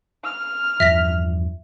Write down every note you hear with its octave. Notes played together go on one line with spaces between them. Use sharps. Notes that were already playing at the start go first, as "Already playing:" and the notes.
F6
E2 G2 F3 E5 A#6 B6